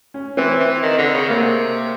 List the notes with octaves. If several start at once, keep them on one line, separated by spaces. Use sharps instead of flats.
C#4
E3 C4
E3
D#3
D3
C#3
C3 A#3